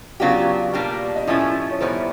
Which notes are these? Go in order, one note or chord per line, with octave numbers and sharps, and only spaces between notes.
C#3 F#3 B3 D4 F4 G4 F5
B2 G3 A#3 D4 G4
D#5
A2 F3 A3 C#4 E4 E5
C#5
D#3 G3 B3 E4 C5